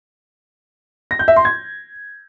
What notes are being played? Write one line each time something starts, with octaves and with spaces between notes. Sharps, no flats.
A#6
G6
E5
C6
G#6